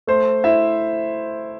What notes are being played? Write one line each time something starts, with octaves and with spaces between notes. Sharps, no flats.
A3 C5
E4 E5